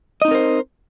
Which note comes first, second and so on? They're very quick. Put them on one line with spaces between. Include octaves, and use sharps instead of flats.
D#5 D#4 C4 A#4 C5